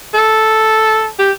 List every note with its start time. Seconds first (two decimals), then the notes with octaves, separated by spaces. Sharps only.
0.14 A4
1.19 G4